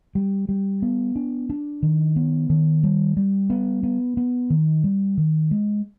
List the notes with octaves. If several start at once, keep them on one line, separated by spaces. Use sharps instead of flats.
G3
G3
B3
D4
D4
D#3
B3
D#3
G3
G3
B3
B3
B3
D#3
G3
D#3
G#3